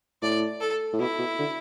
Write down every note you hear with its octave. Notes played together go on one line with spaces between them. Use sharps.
A2 D5
A4
A2
B2 E4
B2
D3